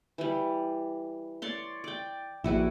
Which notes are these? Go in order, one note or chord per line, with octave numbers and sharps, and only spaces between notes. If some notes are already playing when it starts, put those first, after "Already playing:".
E3 G3
C#5 D5 C6
D5 G5
A#1 E4 F#4 B4